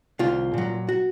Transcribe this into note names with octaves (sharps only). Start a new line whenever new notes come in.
C2 F4
A#2 F#3
F#4